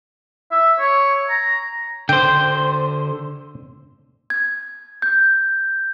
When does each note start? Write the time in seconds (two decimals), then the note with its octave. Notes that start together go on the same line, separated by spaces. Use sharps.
0.52 E5
0.80 C#5
1.30 A#5
2.09 D3 C5 G5
4.30 G#6
5.02 G6